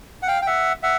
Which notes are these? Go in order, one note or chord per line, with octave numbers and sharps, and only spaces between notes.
F#5
F5 G5
G5
E5 F#5
E5 F#5